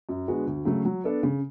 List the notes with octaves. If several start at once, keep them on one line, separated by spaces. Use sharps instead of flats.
F#2
D3 G#3 B3 F#4
D2
C#3 F#3 A3
F#3
B3 D4 A4
C#3